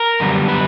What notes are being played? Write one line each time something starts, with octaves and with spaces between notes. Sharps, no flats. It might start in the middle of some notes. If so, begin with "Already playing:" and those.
Already playing: A#4
F#2 D3 G3 B3
B4